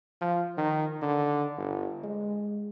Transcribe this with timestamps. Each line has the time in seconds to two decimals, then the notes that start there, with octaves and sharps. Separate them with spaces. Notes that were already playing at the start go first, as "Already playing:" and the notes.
0.21 F3
0.58 D#3
1.02 D3
1.58 G1
2.04 G#3